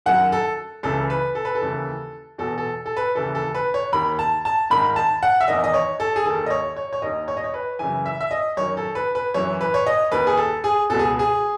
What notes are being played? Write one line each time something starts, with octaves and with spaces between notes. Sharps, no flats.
F#2 D#3 F#5
A4
C#2 C#3 E3 A4
B4
A4
B4
A4
D#2 C#3 E3
E2 B2 A4
A4
A4
B4
D#2 C#3 E3 A4
A4
B4
C#5
D#2 D#3 B5
A5
A5
G#2 D#3 B5
A5
F#5
E5
E2 D#3 D#5
D#5
C#5
A4
G#4
D#2 D#3 A4
D#5
C#5
C#5
C#5
D#2 D#3 D#5
C#5
D#5
C#5
B4
F#2 C#3 E3 G#5
E5
E5
D#5
F#2 D#3 C#5
A4
B4
B4
F#2 E3 C#5
B4
C#5
D#5
D#2 D#3 B4
G#4
A4
G#4
C#2 B2 A4
G#4
G#4